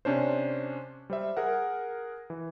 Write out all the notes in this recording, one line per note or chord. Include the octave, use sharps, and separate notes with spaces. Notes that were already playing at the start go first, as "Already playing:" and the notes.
C3 C#4 D4 C5
G3 C5 E5
G#4 A#4 F#5
E3